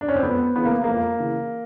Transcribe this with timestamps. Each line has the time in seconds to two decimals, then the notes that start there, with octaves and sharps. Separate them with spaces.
0.01 D4
0.09 C#4
0.16 C4
0.23 F2 B3
0.56 C#3 E3 B3
0.65 A#3
0.84 F2 A#3
1.20 C#3 E3